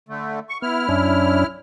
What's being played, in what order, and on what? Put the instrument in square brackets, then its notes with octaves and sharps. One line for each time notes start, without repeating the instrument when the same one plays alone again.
[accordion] D3 A3
C#6
[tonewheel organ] B3 [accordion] E4 F6
[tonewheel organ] F#2 C#4 D4